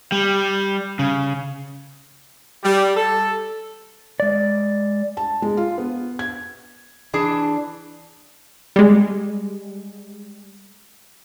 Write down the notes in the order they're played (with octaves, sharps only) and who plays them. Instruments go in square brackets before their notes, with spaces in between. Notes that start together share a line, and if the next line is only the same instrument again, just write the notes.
[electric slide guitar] G3
C#3
[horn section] G3
A4
[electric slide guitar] G#3 D5
[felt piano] A5
G#3
F4
B3
G#6
[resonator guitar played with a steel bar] E3 D4 G#4 A5
[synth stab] G3 G#3